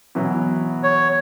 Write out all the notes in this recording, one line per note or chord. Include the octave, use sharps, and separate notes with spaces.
B2 E3 F#3
C#5